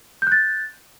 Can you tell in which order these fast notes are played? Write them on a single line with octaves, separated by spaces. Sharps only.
G6 F#6 A6